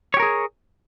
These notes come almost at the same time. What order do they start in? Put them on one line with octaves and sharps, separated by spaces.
C#5 G4 A#4 G#4